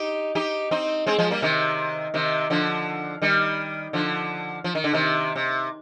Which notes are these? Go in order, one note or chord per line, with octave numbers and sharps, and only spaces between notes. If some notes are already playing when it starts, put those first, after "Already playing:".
Already playing: D#4 G4
D#4 G4
C4 D#4
G#3 C4
F3 G#3
G3 A#3
C3 D#3
C3 D#3
D3 F3
D#3 G3
D3 F3
F3
D#3
D3
C3 D#3
C3